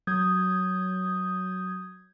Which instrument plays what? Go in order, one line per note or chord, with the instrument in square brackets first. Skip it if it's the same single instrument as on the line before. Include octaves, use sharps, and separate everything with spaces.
[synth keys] F#3 D#6 G6 G#6